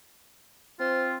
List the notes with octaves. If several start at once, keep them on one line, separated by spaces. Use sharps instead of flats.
C4 F4 C5